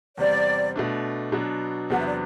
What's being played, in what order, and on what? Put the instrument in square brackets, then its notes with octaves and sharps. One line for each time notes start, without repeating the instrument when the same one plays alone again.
[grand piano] E2 C3 G3 C4 [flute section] D5
[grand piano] B2 A3 D4
B2 F#3 B3 D4
[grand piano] E2 C3 F#3 B3 D4 [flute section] F#5
[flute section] E5
D5